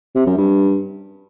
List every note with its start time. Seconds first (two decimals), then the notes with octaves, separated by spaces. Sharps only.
0.15 C3
0.26 F#2
0.38 G2